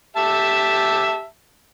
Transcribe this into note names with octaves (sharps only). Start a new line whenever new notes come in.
G4 E5 A5